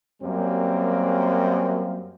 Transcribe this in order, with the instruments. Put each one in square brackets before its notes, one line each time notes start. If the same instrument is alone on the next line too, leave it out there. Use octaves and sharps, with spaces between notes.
[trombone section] F#2 F#3 G3 A#3 C4